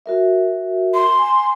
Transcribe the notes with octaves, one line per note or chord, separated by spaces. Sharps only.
F#4 A#4 E5
C6
G#5